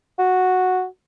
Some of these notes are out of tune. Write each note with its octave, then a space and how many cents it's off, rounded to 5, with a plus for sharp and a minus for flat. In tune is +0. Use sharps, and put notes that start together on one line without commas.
F#4 -5